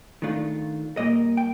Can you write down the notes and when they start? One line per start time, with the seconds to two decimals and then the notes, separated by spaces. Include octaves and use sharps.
0.22 D#3 A3 D4 F4
0.97 A#2 G3 A#3 D#5
1.37 G5